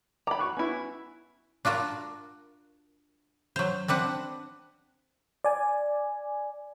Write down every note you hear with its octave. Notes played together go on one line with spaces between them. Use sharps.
A#5 B5 D6
F#4 C#6 F#6
B3 C#4 E4
D4 F4 F#4 A#4
F#3 C5
C4 D4 B4 F#5
D5 G#5